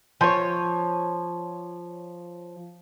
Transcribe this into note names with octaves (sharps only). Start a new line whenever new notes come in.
F3 C#5